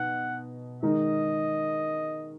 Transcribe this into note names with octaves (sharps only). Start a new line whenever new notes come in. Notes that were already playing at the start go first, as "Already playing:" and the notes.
Already playing: B2 D#4 F#5
D#3 G#3 D#4 A#4 D#5